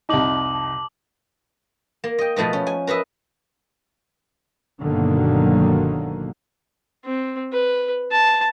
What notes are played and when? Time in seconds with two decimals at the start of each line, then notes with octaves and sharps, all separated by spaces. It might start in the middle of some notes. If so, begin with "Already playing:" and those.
0.09 C2 F2 D#4 A5 D6 F#7
2.04 A#3
2.18 D#5 G5
2.36 B2 F3 A3 B4 D#5
2.53 C#4
2.67 G#5
2.87 A#4 B4 D#5 E5
4.82 G1 B2 D3 D#3 F#3 A#3
7.05 C4
7.52 B4
8.11 A5